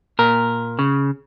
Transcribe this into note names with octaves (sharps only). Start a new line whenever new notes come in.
A#2 A#4
C#3